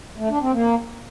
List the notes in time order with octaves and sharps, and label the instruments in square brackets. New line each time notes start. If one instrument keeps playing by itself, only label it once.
[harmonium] A3
D4
C4
A#3